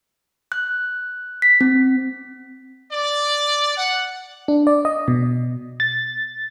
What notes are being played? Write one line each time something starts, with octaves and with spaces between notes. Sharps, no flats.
F#6
B6
C4
D5
F#5
D4
D5
D#5
B2
A6